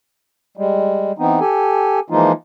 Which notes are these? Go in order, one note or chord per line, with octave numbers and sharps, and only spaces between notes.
G3 G#3
E3 B3 C4 D#4
G4 A4 G#5
E3 F3 G#3 A#3 D#4 F4